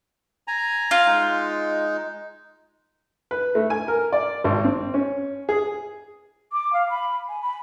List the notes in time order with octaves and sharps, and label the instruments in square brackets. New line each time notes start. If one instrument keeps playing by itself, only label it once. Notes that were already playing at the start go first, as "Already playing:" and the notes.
[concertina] G#5 A#5
[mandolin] F4
[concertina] G#3 D#4
[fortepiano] B4
A3
G#5
A#4
D5
G#1
C4
C#4
G#4
[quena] D6
F5
B5
G#5
B5